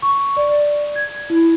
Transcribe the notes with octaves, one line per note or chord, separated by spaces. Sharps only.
C#6
D5
G#6
E4